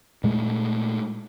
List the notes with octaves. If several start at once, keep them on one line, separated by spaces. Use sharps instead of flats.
A#2 G#3 A3